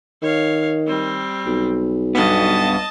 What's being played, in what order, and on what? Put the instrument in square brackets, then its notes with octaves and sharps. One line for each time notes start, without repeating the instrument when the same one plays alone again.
[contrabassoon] D#3 [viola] C#5 F5
[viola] G3 C4
[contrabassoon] B1
[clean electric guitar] G2 B3 [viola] D#5 A5